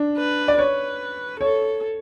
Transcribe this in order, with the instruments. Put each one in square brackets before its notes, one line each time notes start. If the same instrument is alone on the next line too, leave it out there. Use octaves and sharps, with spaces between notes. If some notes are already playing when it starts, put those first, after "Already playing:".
Already playing: [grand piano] D4
[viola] B4
[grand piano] D5
[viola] B4 [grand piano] C#5
[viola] A4 [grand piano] C#5